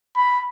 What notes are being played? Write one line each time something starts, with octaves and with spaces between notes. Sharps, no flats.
B5